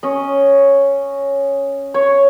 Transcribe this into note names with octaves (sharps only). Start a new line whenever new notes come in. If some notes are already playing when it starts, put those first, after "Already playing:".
C#4 D#5
C#5